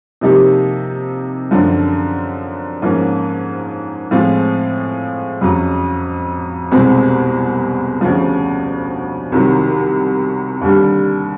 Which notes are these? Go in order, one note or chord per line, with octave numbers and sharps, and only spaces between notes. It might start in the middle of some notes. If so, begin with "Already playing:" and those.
C3 F3 A#3 D#4 G4
F#2 D3 F3
G#2 F3 A#3 C#4
A2 F3 G#3 C4 F4
F2 C#3 F#3
C2 B2 G#3 C4
D2 C#3 F3
C2 C3 D#3 F#3
D#2 D3 G3